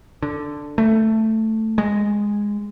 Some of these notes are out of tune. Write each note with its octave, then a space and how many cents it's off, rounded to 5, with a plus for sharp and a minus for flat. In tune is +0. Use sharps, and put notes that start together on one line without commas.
D3 +5
A3 +5
G#3 -10